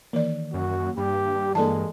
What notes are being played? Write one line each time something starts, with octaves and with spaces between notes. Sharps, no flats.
D#3 E3 A#3 D5
F#2 F#4
G2 G4 B5
E3 G#3 A#3 A4 D5 A5